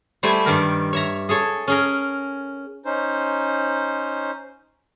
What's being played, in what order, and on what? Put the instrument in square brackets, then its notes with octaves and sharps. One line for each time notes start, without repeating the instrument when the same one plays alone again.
[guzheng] G3 A3 E4 C5 G#5
G2 D#3 A#4
C#5 E5 A#5
G#4 A4 C#5
C#4 G#4 A#4
[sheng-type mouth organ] C#4 D#4 C5